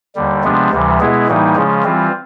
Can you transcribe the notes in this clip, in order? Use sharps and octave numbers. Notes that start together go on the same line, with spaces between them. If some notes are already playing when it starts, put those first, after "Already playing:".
D#2 D3 G3
C3 F3 G#3 B3 D4
D2 C3 E3 G3
B2 G#3 B3 E4 G#4
A2 E3 G3 A#3 D#4
C#3 F3 G#3 C#4
E3 G3 C4 F4